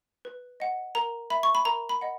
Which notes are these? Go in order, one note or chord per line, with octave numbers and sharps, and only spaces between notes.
B4
D#5 F#5
A#4 A#5
E5 B5
C#6
B5
A#4 A#5
B5
D#5 F#5